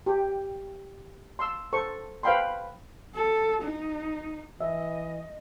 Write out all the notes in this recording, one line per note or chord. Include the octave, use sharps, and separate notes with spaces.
G4
C6 E6
A4 C5 C#6
B4 C5 F5 G5 B5 C6
A4
D#4
E3 D#5 E5